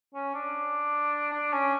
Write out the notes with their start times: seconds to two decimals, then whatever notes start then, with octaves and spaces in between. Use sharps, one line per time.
0.14 C#4
0.34 D4
1.33 D4
1.53 C#4